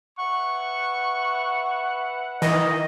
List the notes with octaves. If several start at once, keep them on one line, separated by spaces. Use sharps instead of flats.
B4 E5 F#5 C#6
D#3 E3 D#5